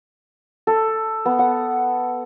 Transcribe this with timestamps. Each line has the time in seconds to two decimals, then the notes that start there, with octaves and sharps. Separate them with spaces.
0.67 A4
1.25 B3
1.39 F#5